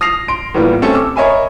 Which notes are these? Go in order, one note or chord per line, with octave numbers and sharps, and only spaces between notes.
D#6 A#6 C7 F7
C6 D7
A2 E3 G3 A#3 B3 F4
A3 C4 C#4 G4 A4
D6 E6
A#4 C#5 D#5 E5 G#5 B5